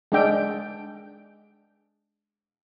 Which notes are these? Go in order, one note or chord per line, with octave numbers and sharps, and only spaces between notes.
G#3 D4 G5